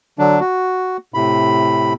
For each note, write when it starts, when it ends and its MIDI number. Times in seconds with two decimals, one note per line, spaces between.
0.19 0.40 50
0.19 0.40 54
0.19 0.40 62
0.40 0.97 66
1.14 1.93 45
1.14 1.93 48
1.14 1.93 83